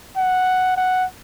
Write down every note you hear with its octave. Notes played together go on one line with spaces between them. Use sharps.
F#5
F#5